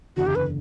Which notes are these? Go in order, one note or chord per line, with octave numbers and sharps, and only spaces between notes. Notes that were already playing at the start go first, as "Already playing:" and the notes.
F#1 E2 D3 F#4
G4
B4